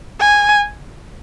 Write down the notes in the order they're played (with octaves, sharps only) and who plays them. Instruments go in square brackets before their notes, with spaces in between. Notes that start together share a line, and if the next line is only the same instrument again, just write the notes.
[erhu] G#5